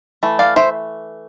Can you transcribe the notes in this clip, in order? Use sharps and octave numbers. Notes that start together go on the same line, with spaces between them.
E3 A3
D5 F5
C5 E5